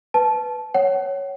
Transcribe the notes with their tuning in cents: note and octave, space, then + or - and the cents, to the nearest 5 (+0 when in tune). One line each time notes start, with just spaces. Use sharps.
B4 +0 A5 -15
C#5 +0 F#5 +35